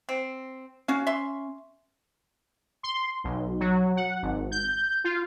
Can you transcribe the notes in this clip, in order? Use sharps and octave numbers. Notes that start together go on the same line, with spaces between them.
C4
C#4 F#4 F5
E5 C6
C6
B1
F#3
F#5
G#1
G6
F4